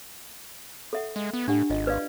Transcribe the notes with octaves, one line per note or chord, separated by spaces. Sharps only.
A4 E5 F#5
G#3
B3
A2 D4 G4 F#5
G#1 F4 D#5
B4 D5 F5